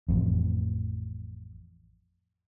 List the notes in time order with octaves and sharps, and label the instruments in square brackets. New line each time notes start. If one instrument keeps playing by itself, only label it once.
[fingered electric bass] A1 F2